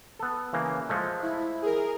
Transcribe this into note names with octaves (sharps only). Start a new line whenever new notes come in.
B3 A4
C#3 E3 A#3
F3 G#3 A3
E4
G#4 A#4